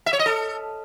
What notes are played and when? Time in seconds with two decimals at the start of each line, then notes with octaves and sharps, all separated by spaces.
0.06 E5
0.13 C#5
0.19 D#5
0.26 A4